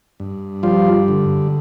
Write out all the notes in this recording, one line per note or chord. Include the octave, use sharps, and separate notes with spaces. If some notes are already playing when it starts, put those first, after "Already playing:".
G2
F3 G3 F4
D3